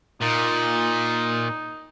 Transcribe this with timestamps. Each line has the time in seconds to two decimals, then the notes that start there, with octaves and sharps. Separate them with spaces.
0.22 A#2 D#4